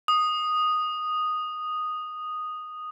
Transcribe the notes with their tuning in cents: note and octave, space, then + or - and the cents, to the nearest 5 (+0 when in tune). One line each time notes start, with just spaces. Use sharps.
D#6 -5